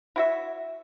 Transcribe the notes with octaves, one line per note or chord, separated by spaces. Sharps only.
E4 F#4 E5